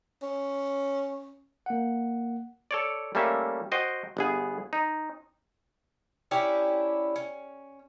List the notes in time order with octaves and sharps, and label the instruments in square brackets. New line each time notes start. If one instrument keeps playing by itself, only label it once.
[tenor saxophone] C#4
[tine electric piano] A#3 F#5
[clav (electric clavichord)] A4 C#5 D5
G3 A3 A#3 C#4 E5
F#4 C5 D#5 G5
G1 B3 G#4
D#4
[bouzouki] C#4 D4 E4 G4
C#4